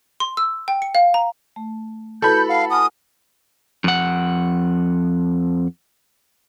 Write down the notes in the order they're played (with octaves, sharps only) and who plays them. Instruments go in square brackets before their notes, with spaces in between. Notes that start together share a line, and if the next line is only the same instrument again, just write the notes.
[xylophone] C6
E6
G5
C#7
F5
A#5
[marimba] A3
[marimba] E4 F#4 B4 [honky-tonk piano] A4 B5 [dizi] G6
[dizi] F5 [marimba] F#5
[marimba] F#5 G#5 F6 [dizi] D#6
[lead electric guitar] F2 F#5